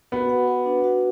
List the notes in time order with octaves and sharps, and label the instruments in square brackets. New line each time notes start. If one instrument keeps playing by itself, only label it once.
[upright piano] B3 [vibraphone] F#4
[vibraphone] F#5
B4
D4
F#4